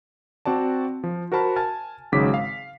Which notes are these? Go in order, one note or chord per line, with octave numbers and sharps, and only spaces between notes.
C4 F#4 D5 A5
F3
F#4 A#4 C5 A5 B5 F6
G#5 A5 F6 A6
G#1 G#2 C#3 F#3 D6 B6
F5